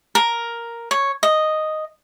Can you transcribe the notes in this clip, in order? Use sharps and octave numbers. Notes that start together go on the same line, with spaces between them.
A#4
C#5
D#5